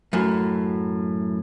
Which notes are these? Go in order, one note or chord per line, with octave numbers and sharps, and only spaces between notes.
F#2 A2